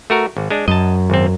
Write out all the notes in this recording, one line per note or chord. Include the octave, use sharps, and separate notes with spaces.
A3 F#4 A#4
G#1
G#3 D4
F#2 D#5 A5
G#1 C4